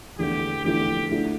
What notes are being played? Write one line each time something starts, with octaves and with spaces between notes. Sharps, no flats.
E2 D3 A3 E4 G4
E2 D3 A3 E4 G4
D2 D3 A3 E4